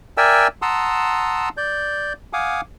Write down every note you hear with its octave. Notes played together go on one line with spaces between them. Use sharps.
A#4 D5 E5 G5 G#5 E6
F#5 A5 A#5 C6 D#6 E6
D5 G6
F5 F#5 G#5 D6 D#6